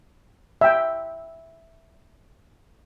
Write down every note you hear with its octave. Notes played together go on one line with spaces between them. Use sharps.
E5 G5